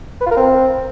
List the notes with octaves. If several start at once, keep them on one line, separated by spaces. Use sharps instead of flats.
B4
F4
A#4
C4